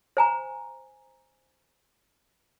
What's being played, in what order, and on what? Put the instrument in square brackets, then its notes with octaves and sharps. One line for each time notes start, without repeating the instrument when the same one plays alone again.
[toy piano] C5 G#5 A#5